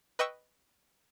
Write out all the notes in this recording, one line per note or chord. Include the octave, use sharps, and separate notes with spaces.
B4 D#5 G5 C#6 E6